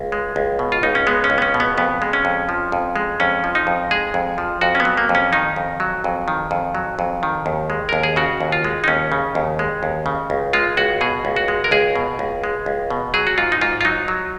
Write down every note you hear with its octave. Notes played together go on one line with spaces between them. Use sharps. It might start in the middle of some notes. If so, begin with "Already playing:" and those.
Already playing: C#2
G#3
C#2
B2
F4
C#2 D#4
C#4
G#3 B3
C#4
C#2
B3
C#4
B2
B3
F2 B3
G#3
C#4
F2
F3
F2
G#3
F2 C#4
F3
D#4
F2
G#3 G#4
F2
F3
F2 F#4
C#4
B3
F#3
A#3
F2
C#4
D#3 D#4
F2
F#3
F2
D#3
F2
F#3
F2
D#3
D#2
G#3
D#2 A#4
G#4
C#3 F#4
D#2
F4
G#3
D#4
D#2 C#4
C#3
D#2
G#3
D#2
C#3
C#2
G#3 F4
C#2 F#4
B2 G#4
C#2
F#4
G#3
A#4
C#2 G#4
B2
C#2
G#3
C#2
B2
F#3 G#4
F#4
G#2 F4
D#4
G#2 F4
F4
F#3 D#4
F#3